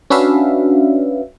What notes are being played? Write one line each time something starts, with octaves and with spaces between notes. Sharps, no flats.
C#4 D4 F#4 B4 E5 F5